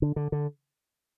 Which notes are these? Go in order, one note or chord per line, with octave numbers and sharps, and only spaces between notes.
D3
D3
D3